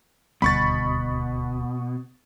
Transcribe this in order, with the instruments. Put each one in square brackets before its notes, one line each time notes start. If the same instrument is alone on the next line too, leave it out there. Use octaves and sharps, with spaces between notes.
[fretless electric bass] D#1 D2 G3 [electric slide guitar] B2 [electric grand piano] B5 C#6 A6